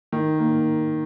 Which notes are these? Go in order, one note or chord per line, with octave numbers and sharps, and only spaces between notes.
D#3
A#3